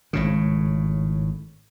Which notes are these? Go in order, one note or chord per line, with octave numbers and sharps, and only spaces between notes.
G#1 A2 C#3